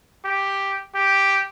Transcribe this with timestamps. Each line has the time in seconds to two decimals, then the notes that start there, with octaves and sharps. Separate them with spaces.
0.25 G4
0.95 G4